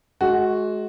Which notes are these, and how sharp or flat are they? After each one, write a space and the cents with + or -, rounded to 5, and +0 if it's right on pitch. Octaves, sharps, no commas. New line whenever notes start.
G#3 +30 F#4 +0